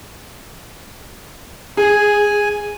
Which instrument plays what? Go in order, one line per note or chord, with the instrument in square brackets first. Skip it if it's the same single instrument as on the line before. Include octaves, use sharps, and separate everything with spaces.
[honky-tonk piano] G#4 [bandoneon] G#5